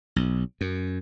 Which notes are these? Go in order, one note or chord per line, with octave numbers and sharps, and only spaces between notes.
B1
F#2